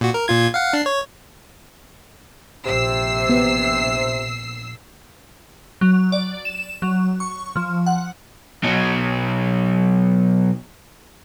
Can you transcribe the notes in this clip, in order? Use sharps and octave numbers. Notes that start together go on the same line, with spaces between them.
A#2 F#4
A#4
A#2 F4 G#6
F5 F#5
D4 C7
C#5
A#1 C3 E6 C7
B3
F#3
D5
E7
F#3
C#6
F3
F#5
B2 F#3